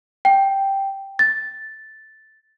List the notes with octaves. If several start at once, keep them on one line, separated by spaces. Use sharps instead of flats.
G5
A6